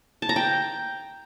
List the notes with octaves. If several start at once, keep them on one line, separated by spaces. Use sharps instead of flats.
A5
A#5
G5